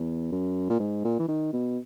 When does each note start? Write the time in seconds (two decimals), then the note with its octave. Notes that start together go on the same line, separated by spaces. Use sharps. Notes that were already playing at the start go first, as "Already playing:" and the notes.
Already playing: E2
0.32 F#2
0.70 A#2
0.80 G#2
1.04 A#2
1.19 E3
1.28 D#3
1.53 B2